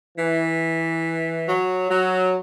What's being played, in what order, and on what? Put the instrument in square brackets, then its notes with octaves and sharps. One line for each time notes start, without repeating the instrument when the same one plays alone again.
[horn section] E3
F#3
F#3